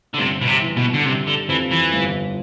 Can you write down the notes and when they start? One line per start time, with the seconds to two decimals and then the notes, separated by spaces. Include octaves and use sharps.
0.14 D3
0.19 G1 C3
0.41 B2
0.47 C3
0.61 E3
0.77 B2
0.94 D3
1.05 C3 G3
1.27 D3
1.48 F2 E3
1.71 E3
1.93 G1